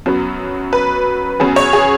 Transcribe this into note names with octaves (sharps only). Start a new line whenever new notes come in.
F#2 F#3 B3
B4
F#2 F#3 B3 G#4
C#5
G#4